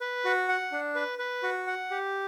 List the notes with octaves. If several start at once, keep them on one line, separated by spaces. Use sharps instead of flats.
B4
F#4
F#5
D4
B4
B4
F#4
F#5
G4